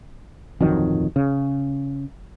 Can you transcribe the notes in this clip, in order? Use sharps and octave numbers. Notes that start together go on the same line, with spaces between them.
D1 F2 D#3 F#3
C#3